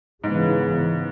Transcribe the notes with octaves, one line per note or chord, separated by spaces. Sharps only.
G#2 C#3 E3 B3